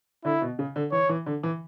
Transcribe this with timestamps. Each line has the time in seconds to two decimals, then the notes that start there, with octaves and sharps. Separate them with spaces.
0.25 D3 E4
0.42 B2
0.59 C#3
0.76 D3
0.92 E3 C#5
1.09 E3
1.26 D3
1.43 E3